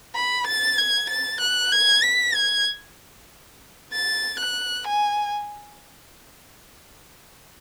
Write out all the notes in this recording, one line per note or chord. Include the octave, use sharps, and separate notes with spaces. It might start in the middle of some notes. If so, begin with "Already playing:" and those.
B5
A6
G#6
A6
F#6
G#6
B6
G#6
A6
F#6
G#5